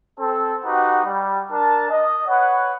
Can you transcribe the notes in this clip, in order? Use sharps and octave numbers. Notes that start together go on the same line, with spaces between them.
C4 A4
D#4 F#4 G4 B4 F#5
G3
D4 A#4 A5
D#5
B4 C#5 F#5